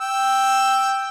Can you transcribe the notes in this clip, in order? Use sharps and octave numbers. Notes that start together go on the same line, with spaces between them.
G5 E6